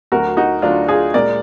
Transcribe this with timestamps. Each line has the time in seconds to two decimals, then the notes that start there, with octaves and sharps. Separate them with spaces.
0.12 D2 D3 F#3 F#4 A#4
0.37 D#4 F#4
0.62 D2 D3 F#3 D4 F4
0.88 F4 G#4
1.14 A#2 G#3 A#4 D5